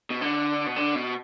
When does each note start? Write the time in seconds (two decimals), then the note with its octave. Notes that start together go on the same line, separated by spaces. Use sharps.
0.10 B2
0.21 D3
0.66 B2
0.76 D3
0.95 B2